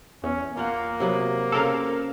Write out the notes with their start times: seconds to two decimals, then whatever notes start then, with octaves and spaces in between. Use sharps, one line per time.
0.23 E2 C#4
0.57 A#3 F4 F#5
1.00 C3 F#3 B3
1.52 C#3 C4 A4 A#4 F5